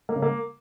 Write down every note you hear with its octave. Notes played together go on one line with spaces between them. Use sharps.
A#3
C#3
A#3